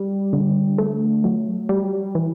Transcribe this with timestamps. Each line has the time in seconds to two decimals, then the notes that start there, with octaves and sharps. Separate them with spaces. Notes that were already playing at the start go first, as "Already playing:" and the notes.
Already playing: G3
0.33 D3
0.78 A3
1.24 F#3
1.69 G3
2.15 E3